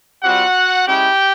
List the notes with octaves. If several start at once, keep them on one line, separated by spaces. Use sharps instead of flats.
G3 C4 F4 F#4 F#5
G#3 C#4 E4 G4 G5